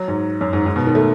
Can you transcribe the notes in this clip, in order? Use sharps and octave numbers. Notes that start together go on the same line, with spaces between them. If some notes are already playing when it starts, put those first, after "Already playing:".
Already playing: F#3
G#2
F#2
G#2
G#2
B2
D#3
A3